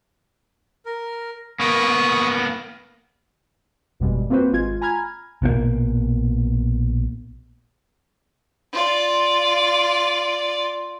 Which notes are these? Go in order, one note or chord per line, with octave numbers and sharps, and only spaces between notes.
A#4
A#3 B3 B5 C#6 D#6
G1 F2 B2 G3 G#3
A#3 C4 F4 F#4 B4 C5
G#1 G#3 F4 G#6
G#5 A#5 B5 F6 G#6
A#1 B2 D#3 A#3
F4 D5